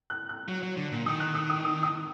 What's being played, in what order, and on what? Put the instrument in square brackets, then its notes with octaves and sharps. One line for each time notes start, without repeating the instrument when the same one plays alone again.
[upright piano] F#6
F#6
[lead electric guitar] F#3
F#3
D3
A#2
[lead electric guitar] D#3 [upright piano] D#6
[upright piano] F#6
D#6
D#6
D#6
D#6